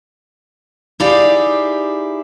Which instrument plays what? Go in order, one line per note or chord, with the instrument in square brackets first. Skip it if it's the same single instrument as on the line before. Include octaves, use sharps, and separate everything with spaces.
[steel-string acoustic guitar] D#4 E4 G4 G#4 D5 F5